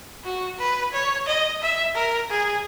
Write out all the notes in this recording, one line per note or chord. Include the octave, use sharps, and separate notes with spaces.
F#4
B4
C#5
D#5
E5
A#4
G#4